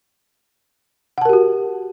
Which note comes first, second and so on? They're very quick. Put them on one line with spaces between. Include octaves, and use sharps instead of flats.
F#5 A5 A#4 G4 F#4